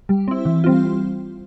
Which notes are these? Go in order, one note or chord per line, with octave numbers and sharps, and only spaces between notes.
G3
C4 E4
E3
G3 C4 F4